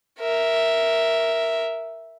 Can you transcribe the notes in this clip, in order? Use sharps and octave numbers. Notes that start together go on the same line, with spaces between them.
A#4 E5